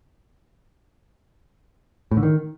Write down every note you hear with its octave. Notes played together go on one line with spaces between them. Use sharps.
A2
D3
D#3